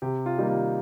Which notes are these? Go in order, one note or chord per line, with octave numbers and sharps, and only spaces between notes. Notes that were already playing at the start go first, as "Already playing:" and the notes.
C3 G4
F4
D#3 G3 A#3 D#4
F4